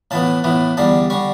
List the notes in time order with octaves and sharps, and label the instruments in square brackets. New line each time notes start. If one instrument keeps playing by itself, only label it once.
[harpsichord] A2 E3 B3 A5
A2 E3 B3
E2 D3 G3 A5
D3 G3 C#6